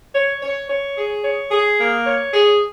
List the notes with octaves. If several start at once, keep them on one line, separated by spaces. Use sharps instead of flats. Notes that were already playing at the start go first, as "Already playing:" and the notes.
C#5
C#5
C#5
G#4
C#5
G#4
A#3
C#5
G#4